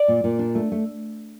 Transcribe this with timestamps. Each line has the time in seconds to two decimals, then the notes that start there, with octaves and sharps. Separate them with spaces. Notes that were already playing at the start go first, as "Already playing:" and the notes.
Already playing: D5
0.08 A#2
0.24 A#2
0.39 D4
0.55 A3
0.72 A3